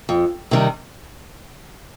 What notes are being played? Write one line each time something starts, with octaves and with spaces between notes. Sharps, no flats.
F2
C3 D#3 G3